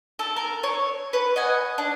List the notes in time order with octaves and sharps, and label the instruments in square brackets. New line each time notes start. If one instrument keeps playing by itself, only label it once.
[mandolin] A4
A#4
C#5
B4 C#5
D#5 F#5 G#5
D4